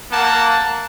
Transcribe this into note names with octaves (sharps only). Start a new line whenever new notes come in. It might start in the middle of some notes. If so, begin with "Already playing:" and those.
A#3 F#5 A5